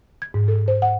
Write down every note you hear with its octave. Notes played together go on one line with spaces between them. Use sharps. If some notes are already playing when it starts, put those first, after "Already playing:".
G#6
G#2
A4
C5
F#5